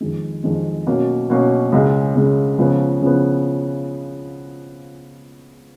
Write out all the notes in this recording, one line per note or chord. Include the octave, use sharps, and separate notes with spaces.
F2 D#3 G#3
F2 D#3 G#3
B2 F#3 A#3 C#4
B2 F#3 A#3 C#4
C#2 C#3 G#3
C#2 C#3 G#3
C#2 C#3 F3 B3
C#2 C#3 F3 B3